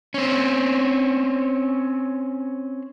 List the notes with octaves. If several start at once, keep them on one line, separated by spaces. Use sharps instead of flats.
C4 C#4